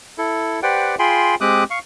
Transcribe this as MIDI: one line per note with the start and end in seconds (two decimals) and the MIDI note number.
0.18 0.60 64
0.18 0.60 69
0.63 0.95 67
0.63 0.95 71
0.63 0.95 72
0.63 0.95 74
0.63 0.95 78
0.63 0.95 79
0.99 1.35 65
0.99 1.35 68
0.99 1.35 79
0.99 1.35 80
0.99 1.35 83
0.99 1.35 84
1.41 1.64 56
1.41 1.64 60
1.41 1.64 67
1.41 1.64 86
1.41 1.64 87
1.41 1.64 90
1.70 1.79 77
1.70 1.79 85